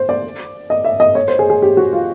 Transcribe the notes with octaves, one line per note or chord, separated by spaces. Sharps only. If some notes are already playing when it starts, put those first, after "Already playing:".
Already playing: C5
D5
D#5
E5
D#5
C#5
C5
G#4
G#4
G4
F#4
F4